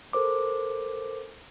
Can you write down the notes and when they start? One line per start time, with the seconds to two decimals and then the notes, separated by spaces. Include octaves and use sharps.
0.13 A4 A#4 C5 D6